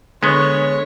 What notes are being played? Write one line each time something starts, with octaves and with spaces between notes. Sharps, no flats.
D3 G#3 B3 C#5